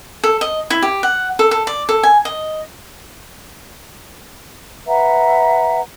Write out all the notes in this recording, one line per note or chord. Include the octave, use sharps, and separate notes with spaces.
A4
D#5
E4
G4
F#5
A4
A4
D5
A4
G#5
D#5
B4 E5 F#5 A#5